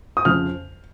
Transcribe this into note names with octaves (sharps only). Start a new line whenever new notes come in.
D#6
F2 C#3 F3 F6